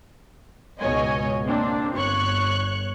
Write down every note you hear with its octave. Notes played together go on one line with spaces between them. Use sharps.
C#2 G#2 B2 C#5 D#5 G#5
A#3 C4 D4
G1 C#5 C#6 F#6